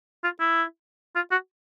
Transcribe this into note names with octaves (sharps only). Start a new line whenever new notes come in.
F4
E4
F4
F#4